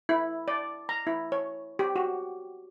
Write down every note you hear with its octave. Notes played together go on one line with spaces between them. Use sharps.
E4
D5
A#5
E4
C#5
G4
F#4